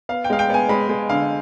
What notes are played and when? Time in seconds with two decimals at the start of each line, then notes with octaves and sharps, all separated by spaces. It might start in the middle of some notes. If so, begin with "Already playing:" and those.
0.09 B3 F5
0.24 G5
0.30 G#3 F5
0.39 G5
0.50 B3 G#5
0.69 G#3 B5
0.89 G#3
1.09 D3 F5